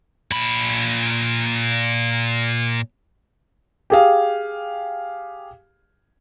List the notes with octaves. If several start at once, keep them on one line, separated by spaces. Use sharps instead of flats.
A#2 B5
G4 G#4 F5